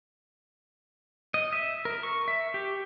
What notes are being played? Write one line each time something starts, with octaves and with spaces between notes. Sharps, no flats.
D#5
E5
A#4
C#6
E5
G4